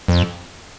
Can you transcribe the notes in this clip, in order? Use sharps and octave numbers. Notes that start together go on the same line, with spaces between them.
F2